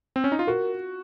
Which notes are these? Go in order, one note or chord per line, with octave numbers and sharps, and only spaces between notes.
C4
C#4
D#4
F4
F#4 A#4